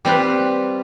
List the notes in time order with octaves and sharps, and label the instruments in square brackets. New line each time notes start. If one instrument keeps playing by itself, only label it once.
[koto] G3 C4 F4 B4